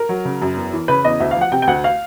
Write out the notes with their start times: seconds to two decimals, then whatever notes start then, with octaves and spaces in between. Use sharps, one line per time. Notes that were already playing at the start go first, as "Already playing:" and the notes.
Already playing: A#4
0.09 F#3
0.25 C#3
0.42 F#2
0.56 E2
0.73 E3
0.88 C#3 B4
1.04 E2 D#5
1.20 D2 E5
1.31 F5
1.36 F3 F#5
1.52 C3 G5
1.62 G5
1.67 D2 F#5
1.84 F5